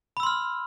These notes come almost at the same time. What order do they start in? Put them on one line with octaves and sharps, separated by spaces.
B5 E6 C6 F6